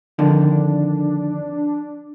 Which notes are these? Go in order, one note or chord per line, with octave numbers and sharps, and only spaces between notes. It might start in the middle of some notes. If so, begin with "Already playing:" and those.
F2 D3 D#3 D4